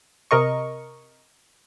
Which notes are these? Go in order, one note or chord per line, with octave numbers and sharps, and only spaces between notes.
C3 A#4 D#5 C#6